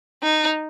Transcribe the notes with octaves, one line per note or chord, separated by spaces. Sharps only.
D#4